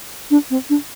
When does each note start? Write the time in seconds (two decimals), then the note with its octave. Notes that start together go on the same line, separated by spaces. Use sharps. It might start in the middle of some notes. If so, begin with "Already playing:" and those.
0.31 D4
0.50 C4
0.70 D4